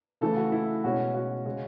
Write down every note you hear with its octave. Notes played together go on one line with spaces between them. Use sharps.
C#3 E3 A3 A4
F#4
E4
B2 G#3 C#4 F#4
F#4
C#3 G#3 C#4